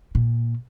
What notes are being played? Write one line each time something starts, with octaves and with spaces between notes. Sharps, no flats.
A#2